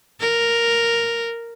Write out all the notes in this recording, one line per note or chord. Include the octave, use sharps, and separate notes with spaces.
A#4